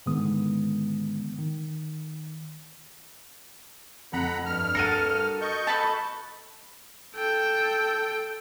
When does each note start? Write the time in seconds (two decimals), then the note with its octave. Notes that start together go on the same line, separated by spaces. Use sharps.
0.06 G#2 D3 D#3 G#3 B3 D#6
1.38 D#3
4.13 F2 F#5 A#5 B5
4.46 G2 F6
4.75 F#4 A4 A#4 C#7 D#7
5.41 D#5 C#6 G6
5.67 A4 B4 A5
7.16 A4 G5